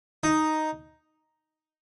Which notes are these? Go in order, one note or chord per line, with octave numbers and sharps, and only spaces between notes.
D#4